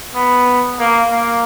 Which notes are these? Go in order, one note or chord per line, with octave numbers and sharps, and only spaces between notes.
B3
A#3
A#3